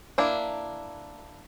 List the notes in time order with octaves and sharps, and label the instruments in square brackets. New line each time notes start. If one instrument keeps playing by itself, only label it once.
[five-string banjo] A#3 D4 E4